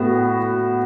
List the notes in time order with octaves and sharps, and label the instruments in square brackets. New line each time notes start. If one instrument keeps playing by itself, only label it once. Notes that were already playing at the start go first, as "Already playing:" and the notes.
Already playing: [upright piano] A2 B3 F#4